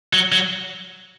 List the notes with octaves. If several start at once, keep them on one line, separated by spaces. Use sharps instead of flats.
F#3
F#3